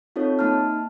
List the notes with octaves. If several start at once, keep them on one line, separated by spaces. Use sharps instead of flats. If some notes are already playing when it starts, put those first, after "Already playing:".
C4 D#4 F4 A4 C#5
A#3 D#4 A5 F6